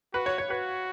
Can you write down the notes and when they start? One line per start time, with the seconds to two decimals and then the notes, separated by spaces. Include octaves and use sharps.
0.14 F#4 B4
0.26 C#5
0.38 C#5
0.50 F#4 B4